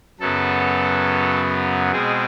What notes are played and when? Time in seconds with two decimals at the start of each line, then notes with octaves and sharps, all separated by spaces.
0.20 F#2 C#3 F#3 B3 A4
1.92 B2 G#3 C4 G#4